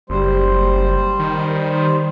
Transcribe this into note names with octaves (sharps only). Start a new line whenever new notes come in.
F#1 G3 C5
D#3